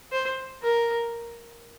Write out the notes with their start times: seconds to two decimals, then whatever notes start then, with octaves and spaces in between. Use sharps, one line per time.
0.12 C5
0.63 A#4